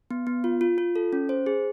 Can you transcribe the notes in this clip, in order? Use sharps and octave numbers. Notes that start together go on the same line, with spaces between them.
B3
B3
F4
F4
F4
A4
C#4
C5
G#4